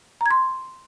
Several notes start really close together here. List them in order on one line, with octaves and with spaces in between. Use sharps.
A#5 G#6 C6